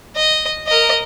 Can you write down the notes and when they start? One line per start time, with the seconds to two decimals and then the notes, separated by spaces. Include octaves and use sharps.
0.16 D#5
0.67 A#4 D#5